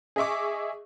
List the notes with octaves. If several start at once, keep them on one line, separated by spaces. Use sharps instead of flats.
G#4 D#5 E5 C#6 D6